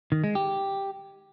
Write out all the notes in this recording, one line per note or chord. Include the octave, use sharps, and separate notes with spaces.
D#3
G#3
G4